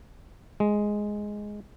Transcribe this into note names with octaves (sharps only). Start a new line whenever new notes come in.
G#3